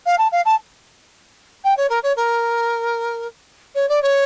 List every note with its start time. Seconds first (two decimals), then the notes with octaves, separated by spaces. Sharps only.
0.06 F5
0.18 A5
0.32 F5
0.45 A5
1.64 G5
1.77 C#5
1.90 A#4
2.03 C#5
2.16 A#4
3.75 C#5
3.89 D5
4.02 C#5